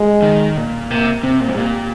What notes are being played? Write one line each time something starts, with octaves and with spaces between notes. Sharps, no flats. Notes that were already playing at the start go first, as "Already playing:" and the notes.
Already playing: G#3
D#3
A#2
C3 A#3
C3 C4
A#2
G#2
A#2 G4